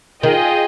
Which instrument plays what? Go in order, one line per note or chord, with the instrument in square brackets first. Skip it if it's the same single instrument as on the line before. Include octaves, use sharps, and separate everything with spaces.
[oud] D#3 [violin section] F4 G#4 D#5 G5